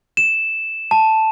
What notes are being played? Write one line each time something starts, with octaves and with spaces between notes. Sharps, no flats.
E7
A5